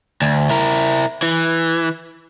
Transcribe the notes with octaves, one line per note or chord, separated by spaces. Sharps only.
D2
E4 A#4
E3